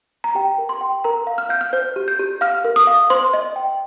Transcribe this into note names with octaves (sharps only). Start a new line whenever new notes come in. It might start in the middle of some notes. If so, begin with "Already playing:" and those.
A#5
G4 G5
A#4
C6
G5
A#4 A#5
F5
F6
F5 G6
F6
C5 G6
G4
G6
G4
F5 F6
A#4
D#6
F5
C5 C6
D#5
G5